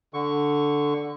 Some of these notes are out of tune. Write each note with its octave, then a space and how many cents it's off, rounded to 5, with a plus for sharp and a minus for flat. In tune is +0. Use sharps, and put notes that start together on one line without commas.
D3 +0 C#6 +0